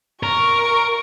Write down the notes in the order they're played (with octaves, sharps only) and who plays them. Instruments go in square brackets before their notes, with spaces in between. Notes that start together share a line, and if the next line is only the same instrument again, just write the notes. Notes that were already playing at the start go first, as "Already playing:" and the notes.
[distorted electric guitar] A#4 [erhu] C#6